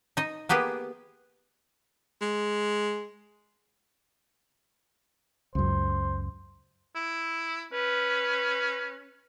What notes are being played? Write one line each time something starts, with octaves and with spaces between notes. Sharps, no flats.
D#4 D#5
A#3 B3 G4 G#4 B4
G#3
C#2 F#2 C5
E4
C#4 B4